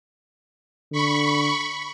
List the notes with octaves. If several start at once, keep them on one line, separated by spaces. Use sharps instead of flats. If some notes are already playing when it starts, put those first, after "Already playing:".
D3 B5 C#6